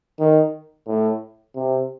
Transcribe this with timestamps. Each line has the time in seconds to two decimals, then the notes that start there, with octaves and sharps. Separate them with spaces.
0.19 D#3
0.87 A2
1.55 C3